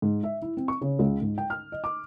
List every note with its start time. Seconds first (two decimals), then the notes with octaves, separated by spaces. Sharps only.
0.02 G#2
0.23 E5
0.42 E4
0.57 C4
0.68 C#6
0.81 C#3
0.99 C#2
1.22 G#2
1.38 G5
1.50 F6
1.72 D#5
1.84 D6